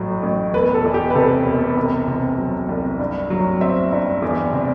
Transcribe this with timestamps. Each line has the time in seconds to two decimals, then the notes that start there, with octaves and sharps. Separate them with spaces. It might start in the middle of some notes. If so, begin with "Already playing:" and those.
Already playing: A1 A2 F#3
0.23 A1
0.54 E1 B4
0.74 A4
0.85 E2
0.94 G4
1.10 B4
1.15 C3 A4
1.45 E1
1.77 C2
2.08 C3
2.38 F#3
2.69 C2
2.99 G2
3.30 F#3
3.61 C4 E5
3.92 G2
4.22 E2
4.53 C3